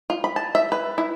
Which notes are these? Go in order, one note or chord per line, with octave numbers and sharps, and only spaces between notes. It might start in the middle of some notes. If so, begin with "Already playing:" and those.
F4
B5
A5
E5
B4
E4